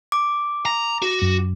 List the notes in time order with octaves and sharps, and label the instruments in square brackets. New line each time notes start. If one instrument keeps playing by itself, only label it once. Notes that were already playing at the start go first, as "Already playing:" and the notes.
[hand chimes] D6
[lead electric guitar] A#5
F#4
[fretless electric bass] F#2